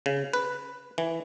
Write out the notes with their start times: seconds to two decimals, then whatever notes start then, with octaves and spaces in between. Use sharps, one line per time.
0.06 C#3
0.33 B4
0.98 E3